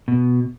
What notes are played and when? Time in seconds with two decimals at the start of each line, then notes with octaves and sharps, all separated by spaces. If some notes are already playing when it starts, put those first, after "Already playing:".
0.08 B2